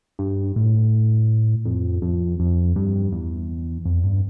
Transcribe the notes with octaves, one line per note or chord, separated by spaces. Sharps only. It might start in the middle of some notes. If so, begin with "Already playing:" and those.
G2
A2
F2
F2
F2
G2
E2
F2
G2